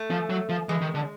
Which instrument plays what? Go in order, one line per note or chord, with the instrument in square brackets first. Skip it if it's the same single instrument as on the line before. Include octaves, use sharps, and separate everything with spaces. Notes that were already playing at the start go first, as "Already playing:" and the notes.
Already playing: [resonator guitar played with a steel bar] A3
[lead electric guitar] F3
F#3
F3
[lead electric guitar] E3 [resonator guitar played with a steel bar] G#3
[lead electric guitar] D#3
D3